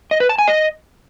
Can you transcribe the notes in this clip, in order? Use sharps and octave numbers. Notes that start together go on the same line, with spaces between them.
D#5
B4
A5
G#5
D#5